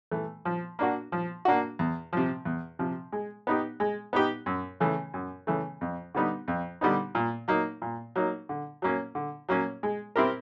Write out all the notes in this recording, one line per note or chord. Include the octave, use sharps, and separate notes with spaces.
E3 A3
F3
A#3 D4 F#4
F3
A#3 D4 F#4
E2
C3 F3
E2
C3 F3
G#3
B3 D#4 G4
G#3
B3 D#4 G4
F#2
C#3 E3 A3
F#2
C#3 E3 A3
F2
D3 G3 B3 D#4
F2
D3 G3 B3 D#4
A#2
F#3 A#3 D#4
A#2
F#3 A#3 D#4
D3
F#3 A#3 C#4
D3
F#3 A#3 C#4
G#3
C4 E4 G4 A#4